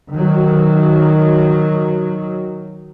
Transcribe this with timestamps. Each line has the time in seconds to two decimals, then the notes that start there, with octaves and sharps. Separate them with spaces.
0.13 D#3 F#3